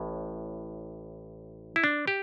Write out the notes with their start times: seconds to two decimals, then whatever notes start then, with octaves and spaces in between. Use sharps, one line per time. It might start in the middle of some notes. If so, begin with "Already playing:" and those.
Already playing: A1 A2
1.76 E4
1.84 D4
2.08 G4